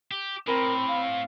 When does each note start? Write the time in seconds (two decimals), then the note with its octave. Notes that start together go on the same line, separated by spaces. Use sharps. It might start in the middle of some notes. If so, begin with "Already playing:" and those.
0.11 G4
0.47 A2 C4 A#4 B5
0.88 F5